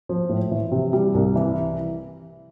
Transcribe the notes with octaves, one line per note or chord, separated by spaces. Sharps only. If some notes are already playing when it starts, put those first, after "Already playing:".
F3
A2
E3
C3
G3
C2
E3